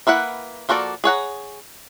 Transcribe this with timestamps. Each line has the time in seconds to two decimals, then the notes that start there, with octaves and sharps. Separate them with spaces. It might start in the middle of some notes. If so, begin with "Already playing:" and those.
0.07 A#3 E4 B4 F#5
0.69 F3 A#3 F#4 A4 D5
1.04 G#4 C#5 F#5 A#5